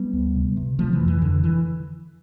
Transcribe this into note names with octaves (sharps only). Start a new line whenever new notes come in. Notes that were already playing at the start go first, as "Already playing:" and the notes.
Already playing: G3 B3
D2
C3
C3
C3 F3 A3
E3
F2
E3
F2 D3
E3